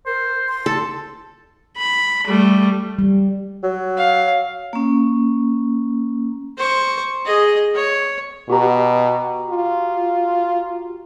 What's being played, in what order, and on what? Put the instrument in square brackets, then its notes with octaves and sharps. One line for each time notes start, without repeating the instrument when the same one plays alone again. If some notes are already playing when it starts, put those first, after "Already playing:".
[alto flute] A#4 [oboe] C5
[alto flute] C6
[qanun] A4 [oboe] A5
[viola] B5
G3 A3
[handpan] G3
[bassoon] F#3
[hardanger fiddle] F5
[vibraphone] A#3 C#4
[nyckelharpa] C5 C#6
G#4 D#5
C#5
[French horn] B2 [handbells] F#4 G4 A#5
[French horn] F4